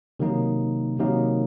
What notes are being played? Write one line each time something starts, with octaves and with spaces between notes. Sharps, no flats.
C3 D#3 F#3 A#3 D#4
C3 D#3 F#3 A#3 D#4